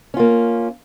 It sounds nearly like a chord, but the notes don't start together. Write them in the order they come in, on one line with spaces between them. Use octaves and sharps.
C#4 F4 A#3